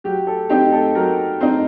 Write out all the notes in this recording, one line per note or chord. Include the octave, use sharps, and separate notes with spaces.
F#3 G4
A4
C4 D#4 G4
A4
F#3 A#4
C4 D#4